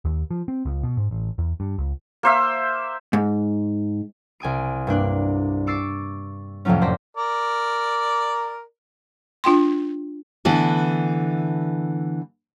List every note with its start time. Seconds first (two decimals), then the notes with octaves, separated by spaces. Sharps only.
0.05 D#2
0.31 F3
0.48 C4
0.65 C#2
0.83 B2
0.97 G#2
1.11 A1
1.38 E2
1.60 G2
1.78 C#2
2.23 A#3 C5 E5
3.13 G#2
4.40 C2 G#5 D#6 D7
4.87 G2 A#3 D4 F#6
5.67 C#6 D6 E6 A6 C7 D7
6.65 F2 A2 C3 F3 F#3 C#4
6.81 F#1 C5 D5 G6 A#6 B6
7.17 A#4 D5
9.44 D4 F4 G5 C6
10.45 D3 E3 A3 B3